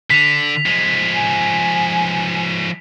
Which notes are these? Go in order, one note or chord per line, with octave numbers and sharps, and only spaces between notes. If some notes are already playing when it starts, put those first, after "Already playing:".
D3 B6 F7
F3 G#3
G#5